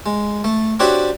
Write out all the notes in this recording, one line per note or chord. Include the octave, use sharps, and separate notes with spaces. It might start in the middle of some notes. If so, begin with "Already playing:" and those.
G#3
A3
C4 D4 F#4 G4 C#5 E5